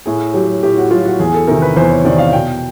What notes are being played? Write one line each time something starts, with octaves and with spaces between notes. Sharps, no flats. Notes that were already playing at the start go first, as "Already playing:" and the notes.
A2 G#4
F#3 G4
A2 G4
F#4
F#3 F4
F#4
E2 G#4
A4
C3 D#3 A#4
B4
E2 C5
C#5
C3 D#3 D5
F5
B2 G5